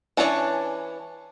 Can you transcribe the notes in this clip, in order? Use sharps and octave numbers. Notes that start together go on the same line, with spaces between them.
E3 C#4 D4 C#5 D5